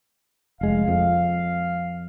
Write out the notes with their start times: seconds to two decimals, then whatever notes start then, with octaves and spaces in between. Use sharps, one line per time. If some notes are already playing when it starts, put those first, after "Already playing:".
0.61 F1 G#3 F5
0.88 F2